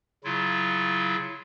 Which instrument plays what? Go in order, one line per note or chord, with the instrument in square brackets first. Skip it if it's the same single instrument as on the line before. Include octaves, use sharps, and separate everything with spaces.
[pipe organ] C#3 F#3 E4 F4